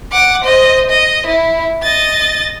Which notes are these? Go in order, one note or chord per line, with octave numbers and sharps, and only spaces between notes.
F#5 D6
C5 D#5
D#5
E4
D#5 A6